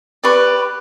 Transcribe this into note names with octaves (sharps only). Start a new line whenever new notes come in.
G4 B4 D5 C#6